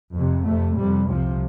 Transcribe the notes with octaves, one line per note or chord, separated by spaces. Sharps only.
F2 C3
F2 C3 A3
F2 C3 G3
C2 C3 F3